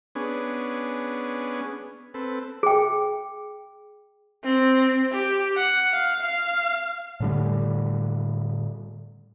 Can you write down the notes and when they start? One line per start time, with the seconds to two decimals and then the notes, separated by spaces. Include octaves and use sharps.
0.15 B3 C#4 D4 G#4
2.14 C4 A4 B4
2.63 G#4 G5
4.44 C4
5.12 G4
5.57 F#5
5.93 F5
6.22 F5
7.20 A2 D3 G3